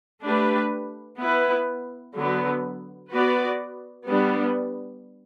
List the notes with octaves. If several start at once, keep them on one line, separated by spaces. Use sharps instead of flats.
A3 D4 G4 B4
B3 E4 B4
D3 F#3 B3
B3 F#4 B4 D5
G3 B3 D4